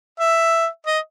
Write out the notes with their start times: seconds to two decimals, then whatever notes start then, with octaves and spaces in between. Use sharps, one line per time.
0.20 E5
0.87 D#5